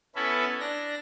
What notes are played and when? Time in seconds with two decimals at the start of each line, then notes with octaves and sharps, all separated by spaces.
0.15 B3 C#4 E4 A4 B4
0.60 D4 A#6